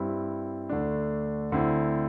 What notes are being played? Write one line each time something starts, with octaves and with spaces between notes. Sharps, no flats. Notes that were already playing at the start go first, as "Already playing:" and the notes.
Already playing: G2 G3 C4 E4
D2 D3 A3 D4
D2 D3 C4 E4